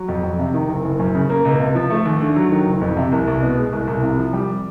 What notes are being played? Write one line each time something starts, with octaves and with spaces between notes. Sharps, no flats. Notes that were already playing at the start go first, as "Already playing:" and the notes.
Already playing: F#3
F2
F2
C3
D#3
F#1
F#1
F#2
C#3
A#3
C#2
C3
F3
A3
D#2
D3
F#3
D#3
F#1
F2
C3
C2
C2
B2
G#3
C2
C2
C3
F3
G3